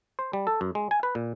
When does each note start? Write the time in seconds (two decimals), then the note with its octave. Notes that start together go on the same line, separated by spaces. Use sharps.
0.19 C5
0.33 G3
0.47 A4
0.61 F#2
0.75 G#3
0.91 G#5
1.03 B4
1.15 A#2